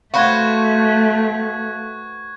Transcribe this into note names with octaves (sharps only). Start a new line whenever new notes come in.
A3 F#4 B4 C5 F5 C#6 F#6 G#6